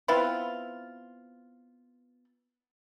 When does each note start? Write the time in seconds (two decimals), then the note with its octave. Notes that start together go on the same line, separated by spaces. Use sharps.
0.08 B3 C4 E4 F4